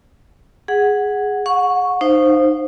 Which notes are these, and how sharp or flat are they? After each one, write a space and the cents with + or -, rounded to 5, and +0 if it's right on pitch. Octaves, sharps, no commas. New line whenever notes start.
G#4 +0 F#5 +0
F#5 -35 C#6 +0
D#4 -25 C5 +0 F5 +0